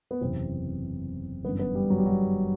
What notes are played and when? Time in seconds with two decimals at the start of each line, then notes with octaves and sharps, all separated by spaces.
0.11 B3
0.21 F#1 E2 C3 E3 C4
1.44 G1 F#2 E3 B3
1.59 B3
1.75 G3
1.90 F#3
1.98 G3
2.06 F#3